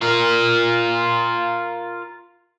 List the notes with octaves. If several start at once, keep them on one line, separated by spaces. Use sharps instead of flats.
F4 A#4